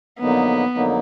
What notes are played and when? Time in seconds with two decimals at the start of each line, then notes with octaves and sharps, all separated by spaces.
0.19 F2 D3 F#3 A#3 B3 D#4
0.75 F2 D3 F#3 A#3 D#4